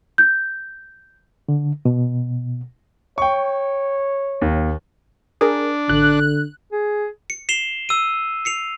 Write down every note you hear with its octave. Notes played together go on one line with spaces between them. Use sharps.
G6
D3
B2
C#5 G5 C#6
D#2
D4 G#4 A#4
A1 D3 F#6
G#4
C#7
C7 E7 F7 G7
E6 D#7
C7 C#7 F7